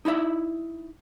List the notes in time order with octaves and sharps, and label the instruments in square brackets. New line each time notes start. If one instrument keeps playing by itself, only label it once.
[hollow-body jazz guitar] D#4 E4 D5 E5